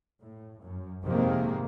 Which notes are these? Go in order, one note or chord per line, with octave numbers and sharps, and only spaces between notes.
A2
F#2
F2 G#2 C3 D#3 G#3 A#3